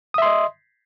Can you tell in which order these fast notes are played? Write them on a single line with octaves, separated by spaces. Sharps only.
D#6 E5 C6 D#5